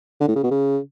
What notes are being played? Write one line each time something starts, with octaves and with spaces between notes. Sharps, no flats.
D3
A2
C#3
B2
C#3